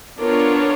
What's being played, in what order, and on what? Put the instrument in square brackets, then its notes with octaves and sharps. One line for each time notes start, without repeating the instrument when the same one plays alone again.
[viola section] B3 D4 F4 A#4 C#5